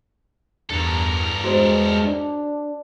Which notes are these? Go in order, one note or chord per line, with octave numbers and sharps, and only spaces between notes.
E2 G2 A4 A#4
G#3 F#4 C5
D4 D5